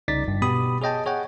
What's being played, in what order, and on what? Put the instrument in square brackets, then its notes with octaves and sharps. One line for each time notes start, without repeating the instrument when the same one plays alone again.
[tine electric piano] C2 C#3 D#4 D5 A6 B6
G1 G2
B2 B3 G4 B5 D#6
G#4 C#5 D#5 G5 A5
G#4 C#5 F#5 G5